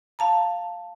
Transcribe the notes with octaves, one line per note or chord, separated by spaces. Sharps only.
F5 A5 A#5